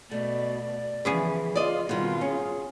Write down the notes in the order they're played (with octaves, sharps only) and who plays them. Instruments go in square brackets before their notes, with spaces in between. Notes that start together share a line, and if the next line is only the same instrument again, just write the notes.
[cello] B2 [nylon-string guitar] A3 [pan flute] D5
[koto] C#3 B3 G#4 [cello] E3 F3
[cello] F4 [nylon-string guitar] D5 D#5
[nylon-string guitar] B2 D#3 [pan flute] G3 [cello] C4 F4
[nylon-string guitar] C#4 [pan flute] G#4